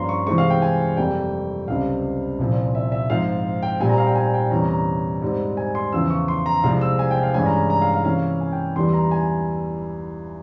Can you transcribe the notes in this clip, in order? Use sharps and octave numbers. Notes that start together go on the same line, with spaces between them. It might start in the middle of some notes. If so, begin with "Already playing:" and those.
Already playing: G2 F3 A#3 C#4 A#5 C6
C#6
C3 E3 G#3 C4 C#6
F5
G5
G#5
F2 C3 G3 A#3 G5
C#2 C3 G3 C4 F5
C2 A#2 F3 C4
E5
E5
G#2 F3 C4 F5
G5
A#2 G3 C4 G#5
A#5
F5
G5
G#5
G5
E2 C3 G3 C#4 A#5
A#5
G#2 G3 C4
G#5
C6
E2 C#3 F3 E6
C#6
C6
A#5
C2 C3 F3 G#3 C4 F5
E6
G#5
G5
F5
G2 E3 G#3 C#4 G#5
A#5
A#5
F5
F5
C3 E3 A#3 C#4 F5
G#5
G5
E2 E3 G3 C6
A#5
G#5